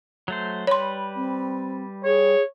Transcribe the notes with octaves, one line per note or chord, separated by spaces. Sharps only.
F#3 A3 C5
G3 B4 C#5 C6
C4
G#4 C#5